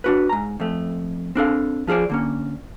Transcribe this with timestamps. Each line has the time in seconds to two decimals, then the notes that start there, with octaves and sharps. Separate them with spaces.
0.04 D4 F#4 B4
0.29 G#2 A#5
0.60 F2 A3
1.35 C4 D4 A4 F5
1.87 F3 F4 G#4 C5 D5
2.10 D3 A#3 C#4